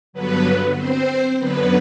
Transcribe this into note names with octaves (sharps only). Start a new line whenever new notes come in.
G2 D3 F#3 B3 B4
C4 C5
F#2 D3 F#3 B3 B4